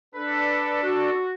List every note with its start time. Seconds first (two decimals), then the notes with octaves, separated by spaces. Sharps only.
0.15 D4 A4 B4
0.83 F#4